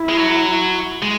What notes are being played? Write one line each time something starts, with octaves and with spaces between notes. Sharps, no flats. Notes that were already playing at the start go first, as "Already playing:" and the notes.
Already playing: E4
G#3
F#3
G#3